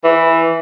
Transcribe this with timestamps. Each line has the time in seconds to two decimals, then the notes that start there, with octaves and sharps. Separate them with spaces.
0.04 E3